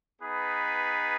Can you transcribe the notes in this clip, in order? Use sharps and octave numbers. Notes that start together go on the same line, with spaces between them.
B3 D#4 G#4 B4